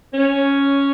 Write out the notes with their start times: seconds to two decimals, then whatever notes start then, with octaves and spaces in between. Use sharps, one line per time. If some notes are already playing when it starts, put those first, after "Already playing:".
0.14 C#4